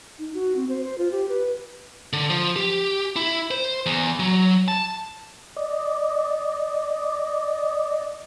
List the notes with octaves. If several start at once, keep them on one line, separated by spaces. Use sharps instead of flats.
D#4
F#4
C4
C5
C5
F4
G4
B4
D3
F3
G4
E4
C5
E2
F#3
A5
D5 D#5